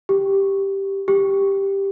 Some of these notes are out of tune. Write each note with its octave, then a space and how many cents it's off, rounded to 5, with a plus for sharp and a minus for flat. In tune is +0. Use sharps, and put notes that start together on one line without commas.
G4 +0
G4 +5